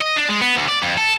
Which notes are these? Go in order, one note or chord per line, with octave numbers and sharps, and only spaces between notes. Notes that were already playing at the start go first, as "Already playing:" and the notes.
D#5
D4
G#3
B3
D2
D5
F2
A4